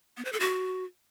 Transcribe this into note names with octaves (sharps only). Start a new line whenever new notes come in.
B3
C5
A4
F#4